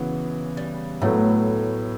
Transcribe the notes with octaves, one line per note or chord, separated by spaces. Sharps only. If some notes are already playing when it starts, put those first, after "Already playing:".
Already playing: C#3 E3 F#3 B3
G3
A2 F#3 A3 B3